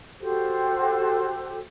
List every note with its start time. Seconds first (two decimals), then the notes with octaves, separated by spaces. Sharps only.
0.20 F#4 G4 A4 C5